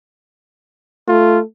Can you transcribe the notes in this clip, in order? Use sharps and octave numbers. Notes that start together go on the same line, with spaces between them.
A3 F4